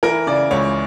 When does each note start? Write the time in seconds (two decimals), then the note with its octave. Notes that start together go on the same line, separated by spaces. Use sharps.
0.03 E3 A#4
0.27 C#3 D5
0.51 C#2 C#5